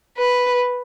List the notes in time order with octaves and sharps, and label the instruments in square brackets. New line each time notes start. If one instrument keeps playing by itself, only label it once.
[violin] B4